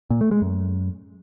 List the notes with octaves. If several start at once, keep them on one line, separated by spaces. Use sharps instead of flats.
A#2
A3
G#3
F#2